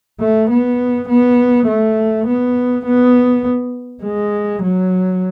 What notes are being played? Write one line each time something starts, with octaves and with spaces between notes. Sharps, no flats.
A3
B3
B3
A3
B3
B3
G#3
F#3